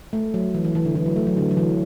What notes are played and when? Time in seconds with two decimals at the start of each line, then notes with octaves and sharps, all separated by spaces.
0.13 A3
0.34 F#3
0.54 E3
0.65 E3
0.75 E3
0.85 D3
0.95 E3
1.06 F#3
1.16 A3
1.27 F#3
1.37 D3
1.51 F#3
1.57 E3